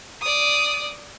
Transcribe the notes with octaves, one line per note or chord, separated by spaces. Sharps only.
D5 D#6